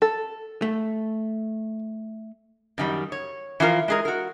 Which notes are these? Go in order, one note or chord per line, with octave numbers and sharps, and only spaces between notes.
A4
A3
F#2 D#3 G3
C#5
E3 F3 F4 A#4
G#3 G#4 A#4
F#4 A#4